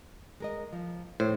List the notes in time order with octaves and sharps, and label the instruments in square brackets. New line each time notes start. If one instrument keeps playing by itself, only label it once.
[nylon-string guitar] G#3 A#4 D#5
F3
[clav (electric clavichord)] A2 [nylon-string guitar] C5